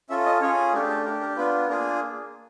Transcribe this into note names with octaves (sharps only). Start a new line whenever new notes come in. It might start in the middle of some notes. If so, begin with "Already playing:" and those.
C#4 F4 A4 E5
D#5
C#4 F4 G#4 C#5
A3 D4 G4 A#4
A4
D4 G4 A#4
A#4
B3 D4 F4 B4
A#3 D4 F4 G#4 A#4